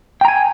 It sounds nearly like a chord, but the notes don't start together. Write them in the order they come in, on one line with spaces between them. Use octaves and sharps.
G5 A#5 G#5